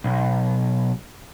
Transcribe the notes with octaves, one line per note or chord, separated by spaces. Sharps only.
B1